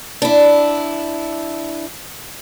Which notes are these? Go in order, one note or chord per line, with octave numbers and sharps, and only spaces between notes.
D4 E4